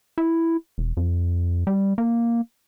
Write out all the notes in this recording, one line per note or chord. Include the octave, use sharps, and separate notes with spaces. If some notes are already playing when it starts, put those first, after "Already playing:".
E4
E1
F2
G3
A#3